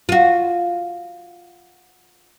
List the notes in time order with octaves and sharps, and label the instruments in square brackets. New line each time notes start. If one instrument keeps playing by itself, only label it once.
[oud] F4 F#4